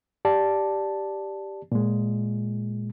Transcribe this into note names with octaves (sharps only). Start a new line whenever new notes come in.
G4 D5 A5
A#2 G#3